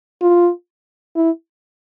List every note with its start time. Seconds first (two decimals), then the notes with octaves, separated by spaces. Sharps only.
0.22 F4
1.16 E4